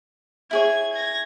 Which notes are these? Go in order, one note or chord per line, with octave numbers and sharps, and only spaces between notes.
E4 G#4 C#5 G#6
G#6 A#6